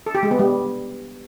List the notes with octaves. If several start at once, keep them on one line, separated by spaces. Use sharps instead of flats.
A4
G4
G#3
B3
G3